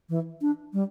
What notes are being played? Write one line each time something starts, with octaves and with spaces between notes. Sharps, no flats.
E3
D4
G3